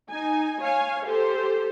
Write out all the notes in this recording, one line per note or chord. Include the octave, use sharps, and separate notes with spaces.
D#4 G#5
C#5 F5 G#5
G4 A4 C5